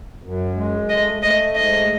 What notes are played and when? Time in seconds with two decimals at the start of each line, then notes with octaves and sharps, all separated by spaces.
0.23 F#2
0.56 G#3
0.89 A3 D#5
1.22 A3 D#5
1.55 G#2 D#5